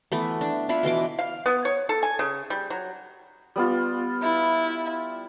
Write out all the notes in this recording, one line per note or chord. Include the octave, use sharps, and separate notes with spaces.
E3 A3 B3
D4
D4 E4 F4 B5
B2 E3 C6 D6
F5
B3
C#5
A4
G#5
C#3
G3
F#3
G3 B3 F4
E4